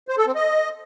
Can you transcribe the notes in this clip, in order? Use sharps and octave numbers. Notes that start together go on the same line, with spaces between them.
C5
A4
C4
D#5